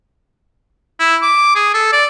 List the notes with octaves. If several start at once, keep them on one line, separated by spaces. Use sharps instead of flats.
E4
D6
G#4
A4
D5